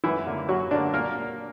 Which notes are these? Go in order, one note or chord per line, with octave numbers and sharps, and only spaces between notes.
F#2 E3 E4
D3 A#3
F#2 F#3 F#4
D3 A#3 D4
A#2 A#3 A#4